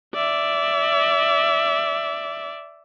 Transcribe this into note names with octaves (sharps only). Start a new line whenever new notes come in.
D5 E5